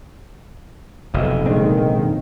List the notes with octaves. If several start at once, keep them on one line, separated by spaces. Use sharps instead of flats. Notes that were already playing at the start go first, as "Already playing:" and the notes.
F1 B1 D#5 E5
A#2 D#3 G#3 C4 D4